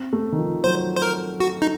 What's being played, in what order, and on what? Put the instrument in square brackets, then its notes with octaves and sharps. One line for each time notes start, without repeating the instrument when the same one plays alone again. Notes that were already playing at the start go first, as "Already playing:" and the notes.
Already playing: [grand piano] C4
A3
D#3
F3
[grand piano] F#3 [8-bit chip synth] C5
[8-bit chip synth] C5
A#4
F#4
D#4